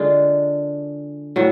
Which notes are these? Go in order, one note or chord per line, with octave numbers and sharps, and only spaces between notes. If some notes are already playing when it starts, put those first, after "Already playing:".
Already playing: D3 G#3 D4 F4
A2 F#3 B3